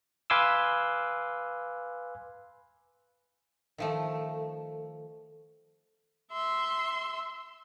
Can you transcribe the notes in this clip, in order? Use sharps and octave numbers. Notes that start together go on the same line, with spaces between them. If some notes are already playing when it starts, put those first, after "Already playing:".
B4 F5 G#5 C6 D6 E6
D#3 F3 A3
E5 C6